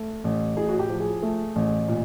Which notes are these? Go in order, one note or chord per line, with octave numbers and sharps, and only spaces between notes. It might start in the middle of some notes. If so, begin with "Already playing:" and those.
Already playing: A3
A1
A2 G#4
F#4
G4
F3
G#4
A3
A1
A#2